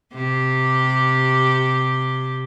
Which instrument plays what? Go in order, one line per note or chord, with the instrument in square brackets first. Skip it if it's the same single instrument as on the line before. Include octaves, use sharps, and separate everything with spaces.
[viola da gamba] C3 G4